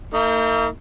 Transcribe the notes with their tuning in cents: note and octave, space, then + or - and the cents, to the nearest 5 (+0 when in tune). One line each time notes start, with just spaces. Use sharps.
A#3 -40 D#4 +30